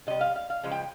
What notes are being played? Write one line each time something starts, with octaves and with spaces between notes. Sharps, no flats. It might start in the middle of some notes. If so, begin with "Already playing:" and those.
C3 G3 D#5
F5
F5
F5
C#3 F3 G#3
G5